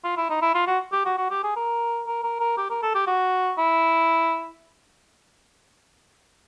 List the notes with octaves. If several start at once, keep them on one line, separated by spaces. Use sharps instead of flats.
F4
E4
D#4
E4
F4
F#4
G4
F#4
F#4
G4
G#4
A#4
A#4
A#4
A#4
G4
A#4
A4
G4
F#4
E4